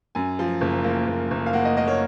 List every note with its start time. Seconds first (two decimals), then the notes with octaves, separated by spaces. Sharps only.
0.15 F#2 G#5
0.39 F3
0.61 F#1
0.84 A#3
1.08 F#1
1.31 F#1
1.46 F5
1.53 A#3 F#5
1.65 D#5
1.77 A#3 D#5
1.88 C#5